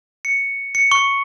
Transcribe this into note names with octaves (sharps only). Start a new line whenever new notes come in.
C#7
C#7
C#6